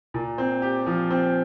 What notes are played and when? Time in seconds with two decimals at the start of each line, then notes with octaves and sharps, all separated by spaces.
0.14 A#2
0.38 C4
0.62 G4
0.86 F3
1.10 C4